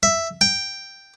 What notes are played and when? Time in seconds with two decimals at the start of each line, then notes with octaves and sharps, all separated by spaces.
0.03 E5
0.41 G5